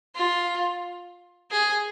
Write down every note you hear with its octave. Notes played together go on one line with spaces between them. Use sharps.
F4
G#4